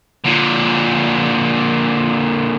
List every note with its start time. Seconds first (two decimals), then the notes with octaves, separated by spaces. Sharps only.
0.24 A#2 D3